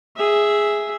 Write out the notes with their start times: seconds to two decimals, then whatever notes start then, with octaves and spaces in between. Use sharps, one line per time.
0.17 G#4 E5